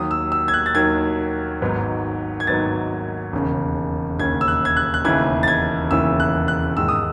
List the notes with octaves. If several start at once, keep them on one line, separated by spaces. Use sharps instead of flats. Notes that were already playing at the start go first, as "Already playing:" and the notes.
Already playing: D#2 D#3 F#3 D#6
E6
E6
G#6
F#6
A6
D#2 D#3 F#3 G#6
G#1 G#2 F#3 B3
G#6
G#1 G#2 F#3 B3 A6
E1 D#2 C#3
E1 D#2 C#3 G#6
E6
F#6
G#6
F#6
F#6
E1 D#2 C#3 E3 G#6
A6
G#6
E1 D#2 C#3 E3 E6
F#6
F#6
G#2 D#3 G#3 E6
D#6